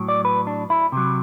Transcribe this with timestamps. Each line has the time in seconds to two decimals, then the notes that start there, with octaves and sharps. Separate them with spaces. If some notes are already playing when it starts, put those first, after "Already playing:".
Already playing: A2 F#3
0.09 D5
0.25 B4
0.47 D4
0.70 E4
0.92 C3 F#3